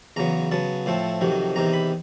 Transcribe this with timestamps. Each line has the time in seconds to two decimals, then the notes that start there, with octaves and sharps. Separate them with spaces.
0.16 E2 C#3 F#3 B3 A#5
0.51 C#3 F#3 B3 A5
0.86 A2 F3 A3 C4
1.21 F2 C3 D#3 F#3
1.56 E2 C3 D#3 A#5
1.73 B5